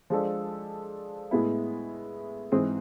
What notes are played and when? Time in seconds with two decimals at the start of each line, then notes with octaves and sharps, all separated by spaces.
0.10 F3 G#3 D4 A4
1.31 A2 G#3 B3 E4
2.52 G#2 E3 G#3 C4 G#4